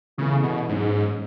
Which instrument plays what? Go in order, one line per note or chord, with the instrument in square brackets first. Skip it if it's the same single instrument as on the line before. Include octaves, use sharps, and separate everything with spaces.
[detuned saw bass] C#3 [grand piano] E3 G#3 B3 E4 A4
[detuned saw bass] B2
[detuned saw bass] G#2 [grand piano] F#3 C#4 G#4 C#5